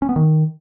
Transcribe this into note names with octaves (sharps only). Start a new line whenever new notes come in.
C#4
B3
D#3